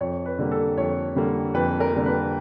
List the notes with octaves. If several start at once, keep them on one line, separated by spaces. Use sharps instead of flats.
F2 C#5
B4
D3 G3 A#3
A4
F2 C#5
D3 G3 A#3
F2 B4
A#4
D3 G3 A#3
B4